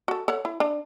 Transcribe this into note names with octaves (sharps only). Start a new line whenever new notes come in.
F#4 A4
A4 C#5 F#5
E4
D4